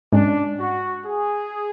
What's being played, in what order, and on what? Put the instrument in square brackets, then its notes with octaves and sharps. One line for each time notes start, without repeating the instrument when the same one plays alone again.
[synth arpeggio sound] G#2 G#3 C#4 [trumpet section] D4
[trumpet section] F#4
G#4